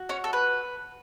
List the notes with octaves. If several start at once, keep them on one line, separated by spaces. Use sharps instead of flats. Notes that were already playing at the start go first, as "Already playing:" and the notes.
Already playing: F#4
C#4 C#5
A4
B4